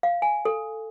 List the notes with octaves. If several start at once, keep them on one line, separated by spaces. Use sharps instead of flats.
F5
G#5
A4